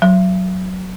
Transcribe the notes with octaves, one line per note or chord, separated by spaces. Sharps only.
F#3